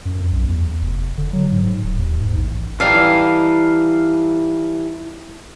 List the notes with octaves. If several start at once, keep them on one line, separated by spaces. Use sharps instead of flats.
F#2
F2
B1
E2
F1
D3
F#3
G#2
D1
D#2
G#2
A1
E3 G3 D#4 A4 F5